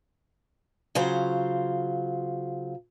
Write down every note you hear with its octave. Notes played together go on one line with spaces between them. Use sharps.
C#3 F#3 F4 C5